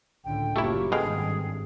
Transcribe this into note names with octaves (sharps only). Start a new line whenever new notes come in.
C#2 A2 D3 G5
F#1 F#3 A3 A#3 E4 F4 G4 C#6
G#1 G2 B2 G#3 G#4 A4 F5 G5